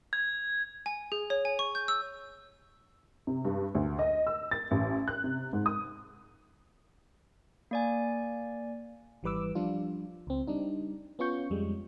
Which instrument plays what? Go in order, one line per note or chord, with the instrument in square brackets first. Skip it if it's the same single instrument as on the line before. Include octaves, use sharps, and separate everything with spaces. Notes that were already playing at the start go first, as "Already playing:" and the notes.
[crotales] G#6
[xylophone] G#5
G#4
C#5
G#5
C#6
G6
E6
[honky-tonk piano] C3
G2
D2
D#5
E6
A6
A1
F#6
C3
G#2
D#6
[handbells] A#3 D5 G#5
[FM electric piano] G#1 E3 G3 B4 D6 E6
F3 G3 D4 F4
C#2 C4
G3 D4 D#4
B3 C#4 F4 C#6 G6
F2 G3 G#3